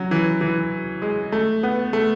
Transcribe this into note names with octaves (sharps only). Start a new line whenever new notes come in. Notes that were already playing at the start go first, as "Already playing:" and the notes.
Already playing: F#3 C#4
E3
E3
G#3
A3
B3
A3